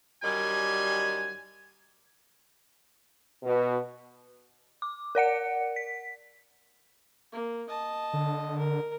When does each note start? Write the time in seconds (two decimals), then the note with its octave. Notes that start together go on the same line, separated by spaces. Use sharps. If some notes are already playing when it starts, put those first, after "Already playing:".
0.23 F#2 D#3 G3 G#5
3.43 B2
4.82 D6
5.15 A#4 D5 F#5 C#7
5.76 B6
7.32 A#3
7.69 D#5 A5
8.13 D3
8.58 A#4